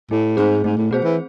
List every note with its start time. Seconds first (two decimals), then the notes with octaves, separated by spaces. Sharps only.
0.11 A2 A3
0.37 G#2 C4 G#4 C5
0.64 G#2 A3
0.78 A2
0.91 B2 C4 G#4 C5
1.03 E3